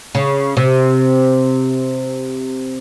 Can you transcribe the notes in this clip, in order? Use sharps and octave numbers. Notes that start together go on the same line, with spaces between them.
C#3
C3